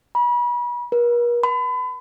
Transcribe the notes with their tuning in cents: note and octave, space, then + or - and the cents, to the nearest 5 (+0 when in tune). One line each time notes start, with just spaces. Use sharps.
B5 -35
A#4 +45
B5 +35